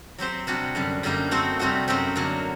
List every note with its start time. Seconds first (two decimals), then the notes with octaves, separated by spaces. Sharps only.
0.18 F#3 C4 G4 C5
0.47 C3 G3 D4 F#4
0.75 F#2 D3 G3
1.03 F#2 D3 G3 A#3 D#4
1.31 A3 C4 F#4 C5
1.59 C3 G3 C4 D#4 F#4
1.88 F#2 F#3 C4 G4
2.16 D3 F#3 A#3